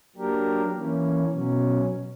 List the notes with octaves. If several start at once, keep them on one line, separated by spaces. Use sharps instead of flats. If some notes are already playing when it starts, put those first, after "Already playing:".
F#3 A#3 D4 G4 A#4
E3 A#3 C#4
B2 F#3 C#4